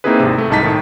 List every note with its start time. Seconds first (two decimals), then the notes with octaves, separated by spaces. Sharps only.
0.04 A#3 C4 D#4 E4 G#4 B4
0.20 G#1 C3
0.38 A3
0.50 C2 G#2 D#4 A5 A6 B6
0.63 A2 D#3